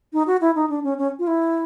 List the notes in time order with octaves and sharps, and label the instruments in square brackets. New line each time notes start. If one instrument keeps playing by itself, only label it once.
[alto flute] D#4
F#4
E4
D#4
D4
C#4
C#4
F4
E4